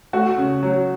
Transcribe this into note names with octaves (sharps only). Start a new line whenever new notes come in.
A3 F#4
C#3
F#3